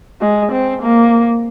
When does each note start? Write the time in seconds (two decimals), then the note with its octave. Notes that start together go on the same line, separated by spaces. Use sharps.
0.21 G#3
0.52 C4
0.82 A#3